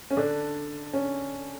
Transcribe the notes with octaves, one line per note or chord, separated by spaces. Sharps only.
C#4
D3 D4
C#4